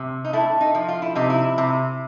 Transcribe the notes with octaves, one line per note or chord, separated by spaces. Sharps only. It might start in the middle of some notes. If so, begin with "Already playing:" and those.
Already playing: C3
D#4
A3 E4
D#4
F3
F4
E4
C3 D#4
E4
C3